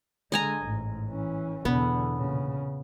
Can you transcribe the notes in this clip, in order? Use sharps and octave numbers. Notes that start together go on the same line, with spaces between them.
D3 G#3 D#5 G#5 A#5
A1 G#2
E3 C#4
E2 B2 D3 B3
A#2 C#3